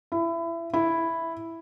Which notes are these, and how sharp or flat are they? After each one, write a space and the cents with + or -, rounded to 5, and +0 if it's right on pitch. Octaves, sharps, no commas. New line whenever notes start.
E4 +25
E4 +0